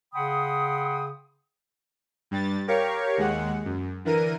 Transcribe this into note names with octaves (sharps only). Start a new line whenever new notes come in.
C#3 F#5 G5 B5 C6 D#6
G2 G3 A6
G4 A#4 C#5 F5 C#6
D#2 G#3 F#5
F#2
D3 E3 A#4 D#7